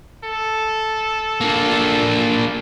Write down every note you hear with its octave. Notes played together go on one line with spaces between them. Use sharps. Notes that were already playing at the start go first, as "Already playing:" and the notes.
A4
A#3 D4